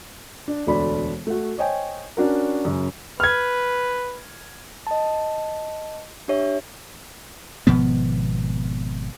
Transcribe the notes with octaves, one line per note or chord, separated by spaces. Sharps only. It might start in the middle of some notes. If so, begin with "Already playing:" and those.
D4
E1 D2 A3 D4 D5 B5
A3 F#4
C5 C#5 D#5 G5 G#5
C#4 D4 F#4 A#4
F#2 C#3
B4 F6 G#6
D#5 A5
D4 G4 C#5 E5
G#1 B2 F3 B3